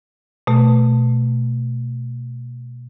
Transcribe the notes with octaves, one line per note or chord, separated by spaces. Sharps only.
B2 A3